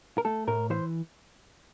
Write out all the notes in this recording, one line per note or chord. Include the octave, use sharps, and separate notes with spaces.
A#4
A3 A4
A2 A#4
E3 C5